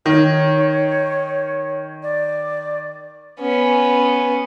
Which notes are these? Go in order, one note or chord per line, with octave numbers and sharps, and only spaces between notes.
D#3 C#5
D5
B3 C#4